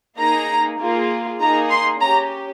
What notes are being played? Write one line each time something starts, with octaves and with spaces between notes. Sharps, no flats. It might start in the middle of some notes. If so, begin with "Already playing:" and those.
A#3 D#4 G#4 A#5
A#3 F4 G#4
A#3 D#4 G#4 A#5
C6
C#4 G4 A#5